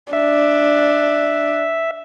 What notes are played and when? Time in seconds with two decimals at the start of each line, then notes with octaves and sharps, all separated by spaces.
0.13 D4 E5